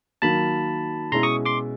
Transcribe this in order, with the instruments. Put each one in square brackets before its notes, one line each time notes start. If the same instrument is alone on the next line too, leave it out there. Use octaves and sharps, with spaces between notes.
[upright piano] D#3 F#3 A#3 [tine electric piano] A5 B5
[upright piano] B2 G#3 C#4 E4 [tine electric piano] A#5 C6
[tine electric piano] C#6 D#6
C6 D6